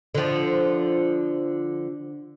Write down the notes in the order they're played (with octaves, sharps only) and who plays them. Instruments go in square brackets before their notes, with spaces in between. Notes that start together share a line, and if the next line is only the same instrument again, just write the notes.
[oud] D3 F3